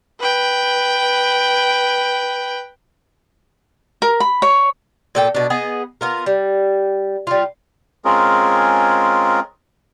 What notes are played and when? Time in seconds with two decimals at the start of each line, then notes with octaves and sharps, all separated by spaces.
0.19 B4 G5
4.02 A#4
4.20 B5
4.42 C#5
5.15 A#2 A4 G5
5.35 B2 D4
5.50 B3 G#4 D#5
6.01 B3 F4 A#4
6.26 G3
7.27 G3 F4
8.05 G#3 C4 C#4 F4 G#4 A#4